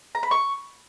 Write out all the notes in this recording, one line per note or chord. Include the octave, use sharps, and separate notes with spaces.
A#5
B5
C#6